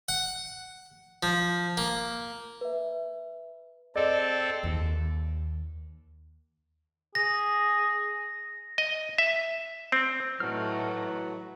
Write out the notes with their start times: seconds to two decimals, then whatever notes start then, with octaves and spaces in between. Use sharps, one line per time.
0.08 F#5
1.23 F3
1.77 A#3
2.61 B4 E5
3.96 C4 G#4 A4 D5 D#5
4.63 D#2
7.15 G#4 A#6
8.78 D#5
9.18 E5
9.92 C4
10.40 A2 E3 F#3 A3 D#4 F#4 F6